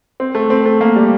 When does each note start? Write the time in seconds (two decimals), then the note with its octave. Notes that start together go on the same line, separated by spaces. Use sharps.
0.20 C4
0.35 A3
0.50 C4
0.66 A3
0.81 A#3
0.96 G3